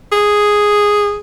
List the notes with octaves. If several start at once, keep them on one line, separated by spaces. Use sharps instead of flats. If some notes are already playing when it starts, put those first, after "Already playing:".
G#4